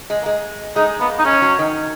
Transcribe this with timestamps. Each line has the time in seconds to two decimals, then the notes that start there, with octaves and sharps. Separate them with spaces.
0.10 G#3
0.22 A#3
0.26 G#3
0.76 G#3 D#4
1.00 A#3 B3
1.19 D#4
1.25 G#3 C#4
1.42 F#3
1.59 D#3